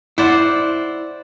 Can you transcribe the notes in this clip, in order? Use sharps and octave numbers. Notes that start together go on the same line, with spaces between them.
E4 C5 D5 F#5